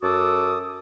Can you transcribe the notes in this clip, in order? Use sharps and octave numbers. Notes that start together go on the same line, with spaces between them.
F#2 F#4 A4 D6 D#6